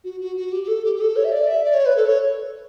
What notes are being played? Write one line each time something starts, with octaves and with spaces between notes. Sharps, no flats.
F#4
F#4
F#4
G4
G4
A4
G4
G4
A4
C#5
E5
D5
E5
D5
C#5
B4
A4
C#5